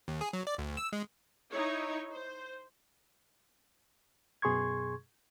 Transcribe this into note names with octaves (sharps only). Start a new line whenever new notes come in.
D#2
G#4
F#3
D5
D2
E6
G#3
D#4 E4 C#5
C5
F#2 B2 G#4 C6 C#6 G#6